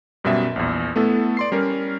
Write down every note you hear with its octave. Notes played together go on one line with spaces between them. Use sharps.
F#2 B2 G3 C#4 E5
A#1 E2
A3 B3 E4 A4
D5 C6 C7
G3 C#4 A#4